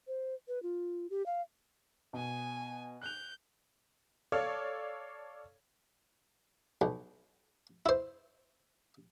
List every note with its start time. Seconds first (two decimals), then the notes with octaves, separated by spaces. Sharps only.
0.07 C5
0.48 B4
0.63 F4
1.10 G4
1.26 F5
2.13 B2 G#5
3.01 F#6 G6 F7
4.32 A4 C#5 D5 F5
6.81 B1
7.86 E4 C5